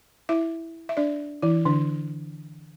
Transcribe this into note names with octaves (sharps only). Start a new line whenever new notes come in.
E4 E5
E5
D4 D5
E3 E4
D3 D4